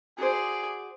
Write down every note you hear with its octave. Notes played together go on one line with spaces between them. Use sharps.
F#4 G#4 C5 D5